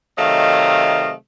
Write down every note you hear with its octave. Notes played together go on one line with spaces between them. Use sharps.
C3 D#3 F#3 A3 D#5 F5